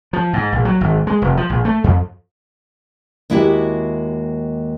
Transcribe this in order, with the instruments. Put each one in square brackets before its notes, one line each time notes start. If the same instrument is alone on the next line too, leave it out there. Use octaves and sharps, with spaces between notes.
[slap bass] F3
G#2
A#1
F#3
G#1
G#3
F1
F3
A#1
A3
F2
[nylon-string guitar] D#2 G#3 E4 F#4 G4 E5